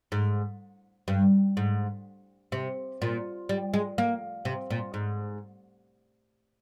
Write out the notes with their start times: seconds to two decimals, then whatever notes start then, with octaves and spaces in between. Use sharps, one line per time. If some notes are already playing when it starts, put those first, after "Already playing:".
0.12 G#2
1.08 G2
1.57 G#2
2.52 C3
3.02 A#2
3.49 G3
3.74 G#3
3.98 A#3
4.45 C3
4.71 A#2
4.94 G#2